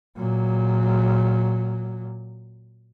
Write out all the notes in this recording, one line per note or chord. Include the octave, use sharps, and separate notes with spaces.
A#2 F#3